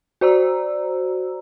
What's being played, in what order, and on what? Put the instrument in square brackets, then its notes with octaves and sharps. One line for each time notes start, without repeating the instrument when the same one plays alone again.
[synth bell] F#4 C5 D5 A#5 E6